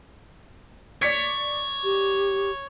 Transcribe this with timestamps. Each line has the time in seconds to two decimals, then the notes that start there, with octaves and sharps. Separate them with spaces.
1.02 C#5 D5 B6 C#7
1.84 G4